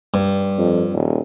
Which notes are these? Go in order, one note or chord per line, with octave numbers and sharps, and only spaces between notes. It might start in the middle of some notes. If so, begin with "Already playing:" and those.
G2
F2
D#1